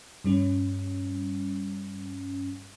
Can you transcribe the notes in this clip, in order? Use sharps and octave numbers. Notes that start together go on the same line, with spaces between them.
G2 G3 C#4